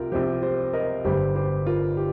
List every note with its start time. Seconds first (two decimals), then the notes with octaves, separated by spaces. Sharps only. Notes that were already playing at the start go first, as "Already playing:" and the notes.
Already playing: C2 C3 F4 G4 A#4
0.12 C2 C3 F3 G4 C5
0.42 G4 C5
0.73 A#4 D#5
1.05 G1 G2 G3 G4 C5
1.36 G4 C5
1.66 F4 A#4
1.97 G4